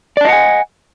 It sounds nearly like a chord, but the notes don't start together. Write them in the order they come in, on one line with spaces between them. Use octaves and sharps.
D5 A5 D#5 F#5 G#5